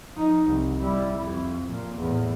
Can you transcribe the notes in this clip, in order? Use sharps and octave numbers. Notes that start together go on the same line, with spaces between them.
F3 D#4
C2
G3 E4
F2
A#2
E2 A2